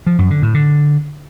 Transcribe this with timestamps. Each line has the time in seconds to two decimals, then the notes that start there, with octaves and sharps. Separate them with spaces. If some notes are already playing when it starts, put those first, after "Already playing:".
0.07 F3
0.18 F#2
0.30 D3
0.42 A2
0.54 D3